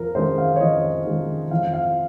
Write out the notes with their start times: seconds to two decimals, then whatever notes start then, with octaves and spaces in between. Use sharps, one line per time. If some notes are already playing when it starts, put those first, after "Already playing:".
Already playing: F2 A#4
0.15 D#3 G#3 C#4 C5
0.38 F5
0.56 C#5
0.61 F2 D#5
1.06 D#3 G#3 C#4
1.51 F2 F5
1.73 F5